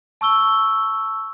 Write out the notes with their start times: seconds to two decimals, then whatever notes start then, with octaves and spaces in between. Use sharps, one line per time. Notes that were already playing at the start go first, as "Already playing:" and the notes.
0.21 A5 C#6 E6 G7